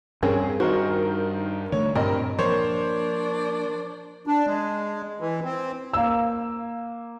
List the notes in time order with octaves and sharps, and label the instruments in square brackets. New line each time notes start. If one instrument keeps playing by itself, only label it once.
[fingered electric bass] G2 G3 [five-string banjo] C4 C#4 A#4 [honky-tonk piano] G#4
[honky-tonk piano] D#3 A#4 [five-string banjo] F#4 [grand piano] C5 D#5
[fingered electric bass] D3 A3 [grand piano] C#5
[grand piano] G2 [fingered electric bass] A#2 [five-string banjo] C4 D#5 [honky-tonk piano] A#4
[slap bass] F3 A#3 [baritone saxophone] D4 [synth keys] A#4 [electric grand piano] C5 C#5
[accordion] D4
G#3
E3
C4
[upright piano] A#3 E6